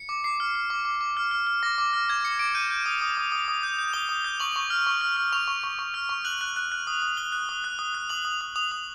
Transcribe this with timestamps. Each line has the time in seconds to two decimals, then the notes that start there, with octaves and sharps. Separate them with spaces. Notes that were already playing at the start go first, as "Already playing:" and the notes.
Already playing: C#7
0.09 D6
0.24 D6 C7
0.40 F6
0.55 F6
0.70 D6
0.85 D6
1.01 D6
1.17 F6
1.31 F6
1.47 F6
1.63 D6 A#6
1.78 D6
1.93 F6
2.08 D6 G#6
2.24 D6 C#7
2.39 D6 D7
2.55 G6 D#7
2.70 G6
2.86 D#6
3.01 D#6
3.17 D#6
3.32 D#6
3.48 D#6
3.63 G6
3.78 G6
3.93 D#6 G7
4.09 D#6
4.24 G6
4.40 C#6 F#7
4.56 C#6
4.70 F6
4.86 C#6
5.01 F6
5.17 F6
5.33 C#6 F7
5.48 C#6
5.64 C#6
5.79 C#6
5.94 F6
6.09 C#6
6.24 F#6 F#7
6.41 F#6
6.56 F#6
6.72 F#6
6.87 D#6
7.02 D#6
7.17 F#6 G7
7.32 F#6
7.49 D#6
7.64 F#6
7.79 D#6
7.94 F#6
8.09 D#6 F#7
8.25 D#6
8.41 D#6
8.56 D#6 F7
8.72 D#6